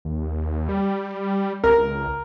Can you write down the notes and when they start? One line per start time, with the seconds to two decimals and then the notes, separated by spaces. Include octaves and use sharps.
0.05 D#2
0.69 G3
1.64 C#2 A#4